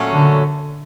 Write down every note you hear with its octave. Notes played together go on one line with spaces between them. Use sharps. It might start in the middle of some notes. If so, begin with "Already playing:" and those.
Already playing: A#2 F#3 A3 C#4
D3